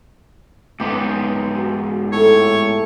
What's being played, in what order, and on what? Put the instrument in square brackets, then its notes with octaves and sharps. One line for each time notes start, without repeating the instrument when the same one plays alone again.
[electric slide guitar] G#2 B3 D#4 [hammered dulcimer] G4 C6
[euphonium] F#4
[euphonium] A2 [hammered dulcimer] A4 [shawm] C#5